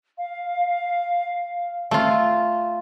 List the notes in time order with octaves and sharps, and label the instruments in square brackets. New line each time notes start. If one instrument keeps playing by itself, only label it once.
[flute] F5
[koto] A3 F4